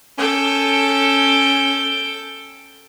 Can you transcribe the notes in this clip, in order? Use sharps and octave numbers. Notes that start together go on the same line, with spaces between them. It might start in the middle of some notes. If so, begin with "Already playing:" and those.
C#4 A4 G5